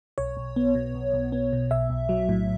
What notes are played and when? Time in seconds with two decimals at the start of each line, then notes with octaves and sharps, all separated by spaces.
0.18 B1 C#5
0.37 B1
0.56 B3
0.75 B2
0.95 B1
1.13 B1
1.32 B3
1.53 B2
1.71 B1 E5
1.90 B1
2.09 F#3
2.29 A2